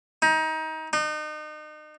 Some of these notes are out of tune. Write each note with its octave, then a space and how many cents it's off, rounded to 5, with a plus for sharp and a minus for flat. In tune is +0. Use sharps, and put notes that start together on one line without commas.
D#4 +25
D#4 -35